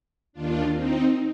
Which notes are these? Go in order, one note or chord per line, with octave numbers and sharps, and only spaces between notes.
D#2 D#3 D4 F4
C4 D#4